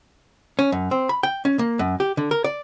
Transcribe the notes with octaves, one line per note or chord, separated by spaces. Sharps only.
C#4
F#2
C4
B5
G5
C#4
A#3
F#2
G4
D3
A#4
D5